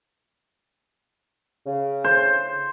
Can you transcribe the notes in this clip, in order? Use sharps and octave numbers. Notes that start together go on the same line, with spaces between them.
C#3
C5